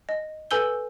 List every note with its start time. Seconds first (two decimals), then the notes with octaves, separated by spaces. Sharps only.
0.09 D#5
0.51 A4 B4 G#5 E6 G6 G7